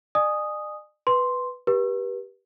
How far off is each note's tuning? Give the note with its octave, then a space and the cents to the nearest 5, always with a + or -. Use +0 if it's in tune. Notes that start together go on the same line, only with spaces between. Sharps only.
D5 +45 G#5 +0 D#6 +0
B4 +0 C6 +0
G4 +0 B4 -35